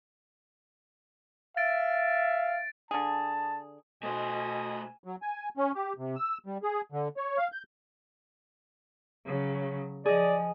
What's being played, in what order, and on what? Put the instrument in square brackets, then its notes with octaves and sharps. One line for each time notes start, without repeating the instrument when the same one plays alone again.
[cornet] E5 [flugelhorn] F5 [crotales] A6 D7
[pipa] D3 G#4 [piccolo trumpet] A5
[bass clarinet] B2 [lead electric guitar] A3 C5 [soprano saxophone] D#5 [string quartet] G#5
[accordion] F#3
G#5
C#4
G4
C3
E6
G3
G#4
D3
C#5
F5
G6
[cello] C#3 F#3
[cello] F3 [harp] G#4 D#5 [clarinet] D5